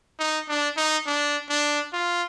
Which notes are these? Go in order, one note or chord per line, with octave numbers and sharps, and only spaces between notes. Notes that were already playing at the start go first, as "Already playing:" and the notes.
D#4
D4
D#4
D4
D4
F4